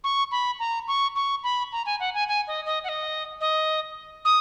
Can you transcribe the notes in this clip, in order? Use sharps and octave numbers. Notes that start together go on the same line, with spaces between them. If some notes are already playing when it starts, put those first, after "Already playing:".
C#6
B5
A#5
C#6
C#6
B5
A#5
G#5
F#5
G#5
G#5
D#5
D#5
F#5
D#5
D#5
D#6